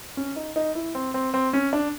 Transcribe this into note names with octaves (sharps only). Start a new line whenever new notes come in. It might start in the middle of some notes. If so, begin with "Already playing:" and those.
C#4
D#4
D#4
E4
C4
C4
C4
C#4
D4